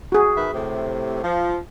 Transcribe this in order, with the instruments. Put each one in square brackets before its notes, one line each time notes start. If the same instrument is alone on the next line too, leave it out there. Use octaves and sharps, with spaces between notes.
[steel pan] F#4 G#4
[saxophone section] D#3 B4 E5
A2 C3
F3